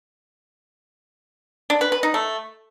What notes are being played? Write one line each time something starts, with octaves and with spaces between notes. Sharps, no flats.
D4
B4
B4
D#4
A3